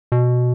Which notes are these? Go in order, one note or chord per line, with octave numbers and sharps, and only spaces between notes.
B2